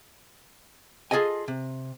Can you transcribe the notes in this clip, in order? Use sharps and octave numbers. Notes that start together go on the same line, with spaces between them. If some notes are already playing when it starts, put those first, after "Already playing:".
F4 G#4 A4 D#5 G#5
C3